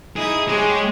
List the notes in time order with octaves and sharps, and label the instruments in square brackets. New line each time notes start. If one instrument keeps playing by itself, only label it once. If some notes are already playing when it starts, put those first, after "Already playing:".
[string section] D#4 E4 D#6 [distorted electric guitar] G#4
[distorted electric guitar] G#3 [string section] G4 G#4 C#5